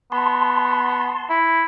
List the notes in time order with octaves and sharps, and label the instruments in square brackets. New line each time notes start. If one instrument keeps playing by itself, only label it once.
[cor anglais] B3 [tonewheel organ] A5 C6
[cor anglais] E4